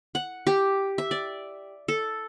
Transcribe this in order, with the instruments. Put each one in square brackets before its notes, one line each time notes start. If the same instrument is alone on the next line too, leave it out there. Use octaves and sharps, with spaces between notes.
[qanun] F#5
G4
E5
D5
A4